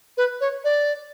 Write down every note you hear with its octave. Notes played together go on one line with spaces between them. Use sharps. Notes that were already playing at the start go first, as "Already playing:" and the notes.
B4
C#5
D5